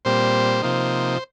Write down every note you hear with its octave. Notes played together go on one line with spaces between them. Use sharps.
A#2 G3 C4 C5
C3 F3 A#3 D#4